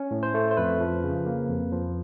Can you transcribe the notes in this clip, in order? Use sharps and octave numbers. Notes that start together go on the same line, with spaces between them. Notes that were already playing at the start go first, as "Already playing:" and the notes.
Already playing: C#4
A2
C5
A3
C5
F2 B4
F3
C#3
A#3
F2
F3